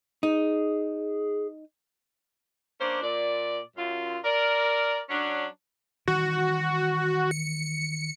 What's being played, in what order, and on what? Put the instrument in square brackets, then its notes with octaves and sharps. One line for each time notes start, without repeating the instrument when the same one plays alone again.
[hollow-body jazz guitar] D#4 [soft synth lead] G#4
[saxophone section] A#3 C#4 D4 C5
A#2 D5
F#2 F4
A#4 D5
F#3 C#4 D4
[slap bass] D#3 E3 G3 [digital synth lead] F#4
[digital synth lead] C#7